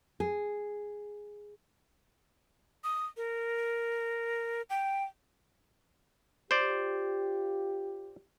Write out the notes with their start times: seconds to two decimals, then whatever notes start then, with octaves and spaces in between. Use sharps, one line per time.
0.20 G#4
2.84 D#6
3.17 A#4
4.70 G5
6.51 F4 G4 C5 D5